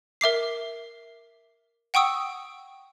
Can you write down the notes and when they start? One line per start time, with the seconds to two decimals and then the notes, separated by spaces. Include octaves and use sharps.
0.21 A#4 E5 D6 C7
1.94 F#5 G5 C#6 D#6 E6